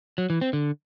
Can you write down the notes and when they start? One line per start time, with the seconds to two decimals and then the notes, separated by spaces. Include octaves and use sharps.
0.18 F#3
0.30 E3
0.41 C4
0.53 D3